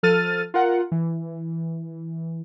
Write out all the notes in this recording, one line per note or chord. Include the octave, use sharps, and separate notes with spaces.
F3 A4 F6 A6 D#7
F4 A#4 F#5
E3